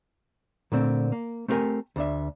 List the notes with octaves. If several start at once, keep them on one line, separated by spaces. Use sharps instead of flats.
A#2 D3 A3 C4
A#3
A3 C4 F4 G4 A#4 G#5
D2 D4 E5